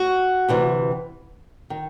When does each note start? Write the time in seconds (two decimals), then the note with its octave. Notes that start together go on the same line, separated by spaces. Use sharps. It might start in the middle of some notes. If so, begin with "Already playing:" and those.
Already playing: F#4
0.49 D2 C3 E3
1.70 D#3